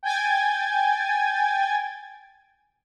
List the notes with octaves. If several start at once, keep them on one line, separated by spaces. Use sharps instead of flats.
G5 G#5 G#6 A6